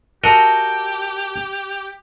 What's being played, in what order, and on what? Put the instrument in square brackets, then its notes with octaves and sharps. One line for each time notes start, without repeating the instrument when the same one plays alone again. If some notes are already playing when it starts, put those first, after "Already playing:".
[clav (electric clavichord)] F#4 A#4 D#5 [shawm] G4 [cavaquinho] A4